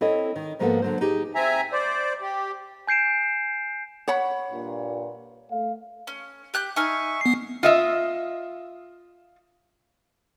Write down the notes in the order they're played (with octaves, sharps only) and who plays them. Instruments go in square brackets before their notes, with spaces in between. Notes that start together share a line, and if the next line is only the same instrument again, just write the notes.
[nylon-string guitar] C4 E4 A4 C#5 D#5
D#3
G#2 F3 A#3 B3 A4 F#5
D3 F#3 C5
D#4 G4 G#4
[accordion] C4 E5 G#5 A#5
C5 D5
G4
[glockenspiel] G#5 G6 C7 D7 E7
[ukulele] C#5 F#5 B5
[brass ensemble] G2 A#2
A3 F5
[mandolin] C#4
G4 F#6 G6
[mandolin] D#4 G#5 F6 [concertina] E5 C#6
[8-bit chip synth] B3 C7
[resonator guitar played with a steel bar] F4 D#5 E5